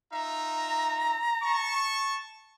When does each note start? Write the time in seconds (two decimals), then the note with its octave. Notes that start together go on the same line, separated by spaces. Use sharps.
0.13 D#4 F4 E5 A#5
1.43 A5 C#6